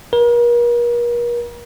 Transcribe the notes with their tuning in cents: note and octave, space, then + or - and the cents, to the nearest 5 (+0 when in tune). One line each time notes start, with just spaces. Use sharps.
A#4 +40